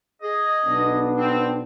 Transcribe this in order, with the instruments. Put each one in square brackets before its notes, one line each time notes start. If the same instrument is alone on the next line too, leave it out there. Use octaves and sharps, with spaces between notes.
[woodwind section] G#4 D#5
[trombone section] B1 B3 D4
[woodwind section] C4